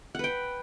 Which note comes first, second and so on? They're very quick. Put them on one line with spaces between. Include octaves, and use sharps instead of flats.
F#5 B4 G5